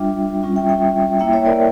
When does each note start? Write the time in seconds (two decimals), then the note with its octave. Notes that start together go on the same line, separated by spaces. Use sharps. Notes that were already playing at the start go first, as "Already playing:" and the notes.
Already playing: G3 D4 F4 E5 G5
0.43 G3 C#4 F4
0.56 E5 G5
0.69 E5 G5
1.19 A#3 E4 E5 G5
1.33 C#5 E5
1.45 A#4 D5